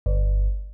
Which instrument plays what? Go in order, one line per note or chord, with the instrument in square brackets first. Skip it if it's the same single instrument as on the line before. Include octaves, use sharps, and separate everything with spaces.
[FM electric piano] G1